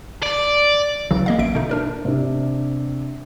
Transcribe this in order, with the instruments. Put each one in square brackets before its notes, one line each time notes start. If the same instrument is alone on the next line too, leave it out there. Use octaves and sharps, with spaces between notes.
[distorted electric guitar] D5
[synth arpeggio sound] C2 C#3 E3 F#3
A#3 D#5 F5
A1 F#3 E5 D7
B2 D3 D#4
D4 A#4 D5
[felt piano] C3 D4